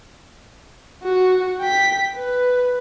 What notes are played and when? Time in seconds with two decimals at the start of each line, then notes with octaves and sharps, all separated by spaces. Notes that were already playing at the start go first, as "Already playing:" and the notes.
1.03 F#4
1.60 G5 B6
2.16 B4